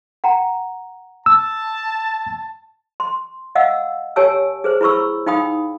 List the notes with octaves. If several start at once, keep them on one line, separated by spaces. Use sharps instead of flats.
F#5 G5 A#5
A5 E6
C6
D#5 F5 F#5 E6
G4 A#4 C#5 G#5 A5 E6
G#4 B4 C5
E4 B4 B5 C#6 E6
D#4 F5 G5 B5 D#6